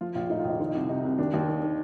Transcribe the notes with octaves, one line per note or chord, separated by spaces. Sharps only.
F3 F4
A#1 F4
A2 D#4
F4
A#1 D#4
D#3 F4
D#4
C2
C3 D#4
C2
D#2 D4
D#2
D#3
D#3